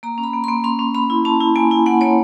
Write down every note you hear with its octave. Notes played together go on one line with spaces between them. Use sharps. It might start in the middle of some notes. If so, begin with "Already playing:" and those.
A#3 A#5
C#4
B5
A#3
A#3 C6
C#4 C6
C#4
C#4 B5
E4
C#4 A5
E4
A#3 G#5
E4
A#3 F#5
A#3 C#5